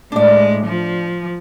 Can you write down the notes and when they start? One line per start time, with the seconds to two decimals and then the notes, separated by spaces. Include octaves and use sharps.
0.12 A2 G#3 D4 D5
0.66 F3